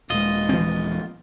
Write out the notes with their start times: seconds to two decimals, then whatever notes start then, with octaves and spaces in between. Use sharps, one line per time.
0.10 D#1 G#3 F4 D#5
0.49 E3 F3 C4